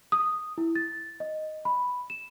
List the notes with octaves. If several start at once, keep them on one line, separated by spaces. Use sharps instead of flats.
D#6
E4
A6
D#5
B5
E7